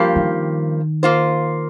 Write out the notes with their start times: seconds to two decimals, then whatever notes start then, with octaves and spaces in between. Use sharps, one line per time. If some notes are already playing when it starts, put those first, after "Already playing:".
Already playing: G2 F3 A#3 G4
0.16 D#3
1.03 A#3 F4 C5